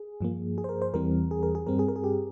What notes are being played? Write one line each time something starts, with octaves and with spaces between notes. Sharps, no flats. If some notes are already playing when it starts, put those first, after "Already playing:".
Already playing: G#4
G2 F3 A#3
G#4
C5
A#4
C5
E2 E3 G3 C4 A#4
G#4
A#4
G#4
G2 G3 C4 A#4
G#4
A#4
G#4
G4